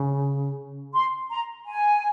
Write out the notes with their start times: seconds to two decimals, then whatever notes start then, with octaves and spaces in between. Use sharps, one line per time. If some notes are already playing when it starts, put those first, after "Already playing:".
Already playing: C#3
0.94 C6
1.30 A#5
1.66 G#5